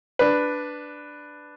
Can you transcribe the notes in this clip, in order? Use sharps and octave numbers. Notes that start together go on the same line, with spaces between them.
D4 B4